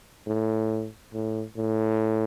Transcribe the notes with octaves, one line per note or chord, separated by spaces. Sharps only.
A2
A2
A2